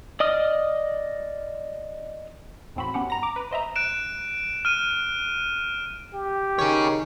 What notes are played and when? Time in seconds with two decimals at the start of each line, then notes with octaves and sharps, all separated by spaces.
0.20 D5 D#5 D#6 F6
2.76 E2 A2 C4 F#4 B5
2.94 B3 C#4 G4 F#5
3.10 G2 A#5 A#6
3.22 A#5 D6
3.36 B4
3.51 C5 D#5 E5 A#5
3.76 F#6 D7 E7
4.65 F6 D#7
6.14 G4
6.59 D#3 G#4 C#5